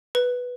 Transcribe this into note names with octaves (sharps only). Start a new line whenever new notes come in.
B4